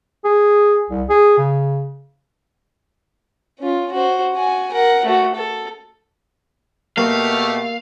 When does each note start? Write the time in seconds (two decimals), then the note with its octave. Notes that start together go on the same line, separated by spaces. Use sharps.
0.25 G#4
0.90 C2
1.10 G#4
1.38 C#3
3.59 C#4 F4
3.92 F#4 C5
4.34 F#4 G#5
4.72 A#4 F#5
5.05 A3 F#4
5.35 A4
6.97 B2 A3 A#3 G4 F5